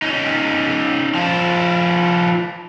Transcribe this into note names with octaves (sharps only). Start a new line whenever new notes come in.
C#4 D#4
F3 E4